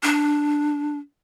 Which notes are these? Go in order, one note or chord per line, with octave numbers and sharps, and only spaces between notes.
D4